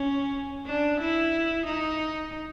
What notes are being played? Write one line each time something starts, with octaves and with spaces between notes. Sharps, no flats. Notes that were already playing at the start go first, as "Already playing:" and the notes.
Already playing: C#4
D4
E4
D#4